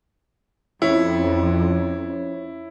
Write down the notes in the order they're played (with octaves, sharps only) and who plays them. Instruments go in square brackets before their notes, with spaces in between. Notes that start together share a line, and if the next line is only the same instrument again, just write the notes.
[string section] F2 [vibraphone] C#4 C#5 [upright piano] E4